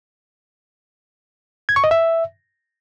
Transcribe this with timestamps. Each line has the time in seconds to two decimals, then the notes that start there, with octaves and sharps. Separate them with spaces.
1.69 G#6
1.76 C#6
1.84 D#5
1.91 E5